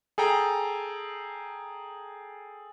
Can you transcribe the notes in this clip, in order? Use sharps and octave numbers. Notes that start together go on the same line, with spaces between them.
G#4 A4 G5 A#5